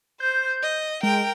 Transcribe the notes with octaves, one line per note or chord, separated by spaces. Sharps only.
C5 G6
D#5
G#3 A#4 G5